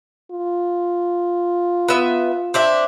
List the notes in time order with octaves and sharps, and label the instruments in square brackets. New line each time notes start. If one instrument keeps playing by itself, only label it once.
[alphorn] F4
[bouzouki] B3 E5
C4 D4 E5